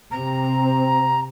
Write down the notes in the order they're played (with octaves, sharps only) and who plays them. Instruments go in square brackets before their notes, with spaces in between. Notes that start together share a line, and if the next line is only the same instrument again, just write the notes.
[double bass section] C3 C4 [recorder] A#5